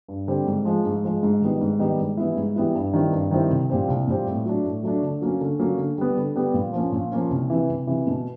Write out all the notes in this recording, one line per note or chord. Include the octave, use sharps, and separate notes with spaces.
G2
D3 G3 C4
G#2
F3 G#3
G#2
F3 G#3
G#2
D#3 G3 B3 D#4
G#2
D#3 G3 B3 D#4
G#2
E3 G3 B3 E4
G#2
E3 G3 B3 E4
G2
D#3 G3 C4 E4
G2
D#3 G3 C4 E4
C2
A#2 G3 C4
C2
A#2 G3 C4
A2
F#3 A3 D4
A2
F#3 A3 D4
D3
F#3 A#3 C#4
D3
F#3 A#3 C#4
D3
G3 B3
D3
G3 B3
A#2
F3 A#3 C#4
A#2
F3 A#3 C#4
C2
C3 E3
C2
C3 E3
B2